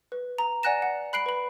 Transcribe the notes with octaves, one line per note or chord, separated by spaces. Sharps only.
B4
A#5
D5 F#5 G#5 F#6 A#6 E7
F#5
B5 F#6 C7 D7 F#7
B4 B5